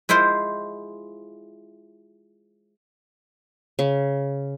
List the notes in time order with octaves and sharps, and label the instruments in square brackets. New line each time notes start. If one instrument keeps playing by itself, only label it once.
[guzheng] G#3 E4 F4 C5
[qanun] C#3